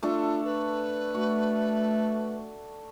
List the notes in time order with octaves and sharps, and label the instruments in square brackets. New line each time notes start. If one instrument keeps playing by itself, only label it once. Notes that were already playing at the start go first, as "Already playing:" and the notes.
[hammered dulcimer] A3 D4 A4 [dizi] F4
[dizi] B4
[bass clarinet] A3 [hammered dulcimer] F#4